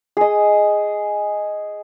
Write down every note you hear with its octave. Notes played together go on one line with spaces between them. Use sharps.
G#4 D#5